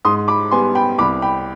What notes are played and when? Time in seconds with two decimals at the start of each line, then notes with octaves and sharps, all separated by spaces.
0.05 G#2 C6 D#6
0.28 B5 D6
0.51 G3 B3 G#5 C6
0.75 G5 B5
0.98 C2 B5 D6
1.22 G5 B5